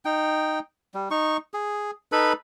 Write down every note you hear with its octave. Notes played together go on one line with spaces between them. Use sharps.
D#4 G5
G3
D#4 C#6
G#4
D#4 A4 B4 B5